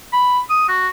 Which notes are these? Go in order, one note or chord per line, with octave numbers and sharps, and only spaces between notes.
B5
D#6
F#4